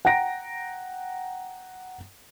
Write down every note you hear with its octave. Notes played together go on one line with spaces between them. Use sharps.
F#5 G5 A#5 A#6 D7